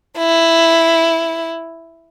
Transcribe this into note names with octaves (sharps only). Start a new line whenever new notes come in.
E4